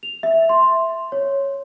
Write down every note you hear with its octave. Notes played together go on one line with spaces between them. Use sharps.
F7
E5
C6
C#5